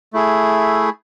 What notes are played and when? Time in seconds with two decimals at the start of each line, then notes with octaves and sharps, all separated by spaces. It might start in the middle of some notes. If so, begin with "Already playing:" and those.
0.13 A3 E4 G#4